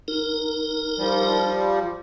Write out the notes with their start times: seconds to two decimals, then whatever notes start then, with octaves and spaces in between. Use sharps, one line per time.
0.08 D#4 A#4
0.98 F3 G3